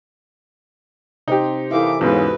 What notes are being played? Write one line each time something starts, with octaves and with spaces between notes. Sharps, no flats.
C3 D#4 G4 C5
E3 A4 A#4 E5 F5 D6
E2 G#2 C#3 F#4 B4